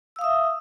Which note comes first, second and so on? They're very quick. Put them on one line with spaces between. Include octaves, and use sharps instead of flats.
E6 F5 D#6 E5